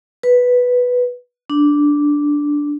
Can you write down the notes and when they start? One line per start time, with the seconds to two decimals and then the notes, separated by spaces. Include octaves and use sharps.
0.23 B4
1.50 D4